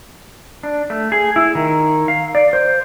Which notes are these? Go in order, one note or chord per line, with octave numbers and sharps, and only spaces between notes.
D4
A3
G#4
E4
D#3
F5
D5
C5